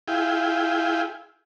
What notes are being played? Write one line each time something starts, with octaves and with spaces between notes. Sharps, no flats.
E4 F4 G#4 G5